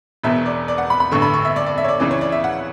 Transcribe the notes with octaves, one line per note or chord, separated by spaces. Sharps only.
E1 E2 B2 E5
D5
D5
F#5
B5
B5
A1 G2 D3 C#6
B5
C#6
E5
D5
D5
E5
C#5
D5
C#2 C#3 E3 D5
C#5
D5
E5
F#5